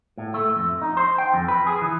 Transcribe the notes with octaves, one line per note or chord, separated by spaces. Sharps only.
A2
A3
F2
D#4
C5
G5
F2
B4
G#4
E3